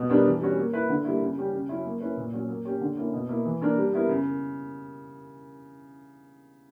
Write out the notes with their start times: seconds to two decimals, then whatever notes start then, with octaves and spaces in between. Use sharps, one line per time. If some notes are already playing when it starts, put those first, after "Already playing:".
Already playing: B2
0.09 G3 B3 D4 A#4
0.26 E3
0.41 G3 C#4 F#4
0.57 A#3
0.73 E4 B4
0.89 D3
1.05 G3 A#3 E4
1.22 C#3
1.37 G3 C#4 G4
1.53 C#3
1.69 F#3 C#4 E4
1.85 A#3
2.00 C#4 E4 B4
2.17 A#2
2.33 F#3 C#4
2.49 A#3
2.65 C#4 G4 C#5
2.81 D3
2.97 A#3 C#4 E4
3.13 B2
3.29 A#3 E4
3.45 E3
3.61 A#3 D4 A#4
3.77 G3
3.93 B3 E4 A#4
4.09 C#3